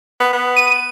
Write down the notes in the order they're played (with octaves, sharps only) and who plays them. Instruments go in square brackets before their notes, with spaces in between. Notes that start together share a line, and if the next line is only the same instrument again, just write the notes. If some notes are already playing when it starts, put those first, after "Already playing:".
[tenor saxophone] B3
B3
[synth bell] D#7